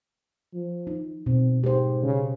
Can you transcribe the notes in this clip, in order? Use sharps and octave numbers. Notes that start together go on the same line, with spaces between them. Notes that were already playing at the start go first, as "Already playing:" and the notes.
F3
D#4
B2 C4
G#2 G4 C5
C#3